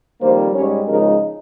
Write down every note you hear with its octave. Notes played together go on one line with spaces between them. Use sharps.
F2 D#3 G3 A#3 C5
G#2 G3 C#4 C#5
C#3 F3 G#3 D#4 A#4